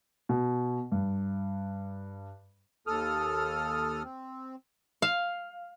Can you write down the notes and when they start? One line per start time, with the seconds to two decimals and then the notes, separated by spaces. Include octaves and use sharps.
0.29 B2
0.92 G2
2.87 D#2 A4 D#6 F6
4.04 C4
5.02 F5